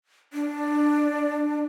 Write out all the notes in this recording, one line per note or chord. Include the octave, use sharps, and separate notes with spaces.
D4